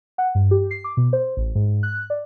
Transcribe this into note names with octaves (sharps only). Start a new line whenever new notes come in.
F#5
G2
G4
C7
D6
B2
C5
A1
G#2
F#6
D5